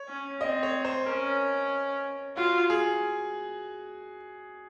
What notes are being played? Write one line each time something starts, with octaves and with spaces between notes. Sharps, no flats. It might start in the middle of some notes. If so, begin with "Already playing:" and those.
Already playing: C#5
C#4
C4 D#5
C#5
C5
C#4 A#4
F4 F#4
G#4